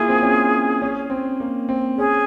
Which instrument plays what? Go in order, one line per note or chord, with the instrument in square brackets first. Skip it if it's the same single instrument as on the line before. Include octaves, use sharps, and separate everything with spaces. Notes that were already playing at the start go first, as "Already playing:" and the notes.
Already playing: [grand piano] A#3 E4 F4 [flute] G#4
[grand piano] C4
C#4
C#4
C4
A#3
C4
[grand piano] C#4 [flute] G#4